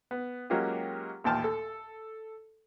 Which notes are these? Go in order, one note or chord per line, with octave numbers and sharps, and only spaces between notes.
B3
F#3 G#3 A#3 C#4 F4 G4
A1 D#2 A#2 G5 A5 F6
A4